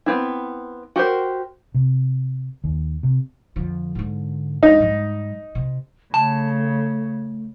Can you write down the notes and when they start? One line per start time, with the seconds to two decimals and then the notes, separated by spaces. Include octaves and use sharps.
0.06 B3 C4 E4
0.96 F#4 G4 A#4 C5
1.75 C3
2.64 D#2
3.03 C3
3.56 F2 D3
3.95 G#2 D3
4.63 E2 G#3 D#4
4.80 G#2 G3
5.55 C3
6.14 C#3 A3 A5